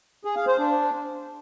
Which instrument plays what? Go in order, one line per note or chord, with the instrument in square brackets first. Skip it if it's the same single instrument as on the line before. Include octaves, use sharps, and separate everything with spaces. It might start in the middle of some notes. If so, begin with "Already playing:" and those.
[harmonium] G#4
F5
C5
D4